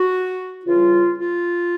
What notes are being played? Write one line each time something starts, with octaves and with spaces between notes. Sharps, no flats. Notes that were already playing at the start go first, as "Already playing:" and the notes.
Already playing: F#4
C#3 E3 G3 F4
F4